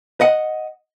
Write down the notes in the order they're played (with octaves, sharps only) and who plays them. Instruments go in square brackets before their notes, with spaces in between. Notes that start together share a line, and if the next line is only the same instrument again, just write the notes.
[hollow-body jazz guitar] D#5 F#5